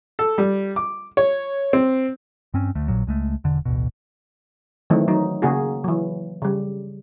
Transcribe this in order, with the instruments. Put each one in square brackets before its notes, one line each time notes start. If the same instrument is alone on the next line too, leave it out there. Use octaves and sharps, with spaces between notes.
[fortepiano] A4
G3
D6
C#5
C4
[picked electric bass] G2 C4 C#4
D2 A3
A#1 A#2 F#3
C#2 G#3 A3
E1 D3
A1 D2 B2
[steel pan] D#3 E3 F#3 A3 C4
F#3 D#4
C#3 A#3 F#4 G#4
E3 F#3
C#3 G3